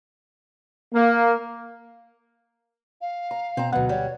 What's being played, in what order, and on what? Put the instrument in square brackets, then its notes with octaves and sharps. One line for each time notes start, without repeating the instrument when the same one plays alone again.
[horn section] A#3
[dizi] F5
[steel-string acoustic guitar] A#5
[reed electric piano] B2 [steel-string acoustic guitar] C4 A#5
[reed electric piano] D2 F#5 [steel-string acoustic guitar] B2 F#3
[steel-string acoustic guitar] G3 [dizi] C#5